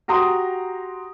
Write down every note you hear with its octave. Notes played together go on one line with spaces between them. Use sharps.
F#4 G4 A#5 C6 D#6